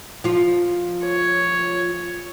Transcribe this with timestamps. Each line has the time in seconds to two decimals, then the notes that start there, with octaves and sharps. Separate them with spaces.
0.24 F3 F4
1.05 C#5